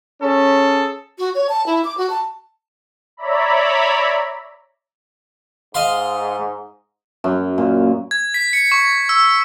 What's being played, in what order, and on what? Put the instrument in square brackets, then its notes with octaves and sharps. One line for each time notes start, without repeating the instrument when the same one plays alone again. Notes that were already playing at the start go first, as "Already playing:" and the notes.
[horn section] C#4 G#4 A4
[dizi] F#4
C#5
A5
E4
D6
F#4
A5
[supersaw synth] C#5 D5 E5 A#5 B5
[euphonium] G#2 [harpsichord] D#5 F5 C6
[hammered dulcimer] F#2
A#2
[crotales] G#6
B6
C#7
C#6
E6